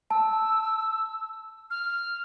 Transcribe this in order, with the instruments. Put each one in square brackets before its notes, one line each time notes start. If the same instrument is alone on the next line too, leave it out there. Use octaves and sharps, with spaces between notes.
[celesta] A5 [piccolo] E6
[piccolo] F6